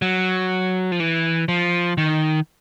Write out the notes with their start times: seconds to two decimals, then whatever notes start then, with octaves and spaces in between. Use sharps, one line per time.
0.02 F#3
0.92 F3
1.00 E3
1.48 F3
1.98 D#3